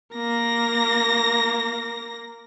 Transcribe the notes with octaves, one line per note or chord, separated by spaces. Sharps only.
A#3 A#6